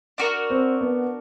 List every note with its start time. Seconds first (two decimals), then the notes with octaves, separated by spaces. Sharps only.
0.18 D4 F#4 A#4
0.50 C4
0.81 B3